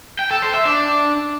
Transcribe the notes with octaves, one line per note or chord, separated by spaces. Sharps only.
G5
A4
C5
E5
D4